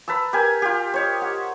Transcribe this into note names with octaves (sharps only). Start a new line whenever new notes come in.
B4 A5 A#5 E6
G4 A#4 G#5
F4 G4
C5 C#5 D#5
F#5